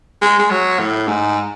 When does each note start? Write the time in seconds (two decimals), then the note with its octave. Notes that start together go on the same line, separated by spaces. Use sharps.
0.22 G#3
0.39 G#3
0.51 F#3
0.79 A2
1.08 G#2